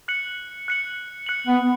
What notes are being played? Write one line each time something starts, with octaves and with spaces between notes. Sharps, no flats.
F#6 C#7 F#7
F#6 C#7 F#7
F#6 C#7 F#7
B3